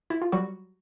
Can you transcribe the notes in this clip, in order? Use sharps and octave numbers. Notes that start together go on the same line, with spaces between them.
E4
F4
F#3 G3 F#4